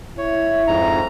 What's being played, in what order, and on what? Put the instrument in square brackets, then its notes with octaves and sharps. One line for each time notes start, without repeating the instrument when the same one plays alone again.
[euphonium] E4 [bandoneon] C#5
[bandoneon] F2 G#2 A#5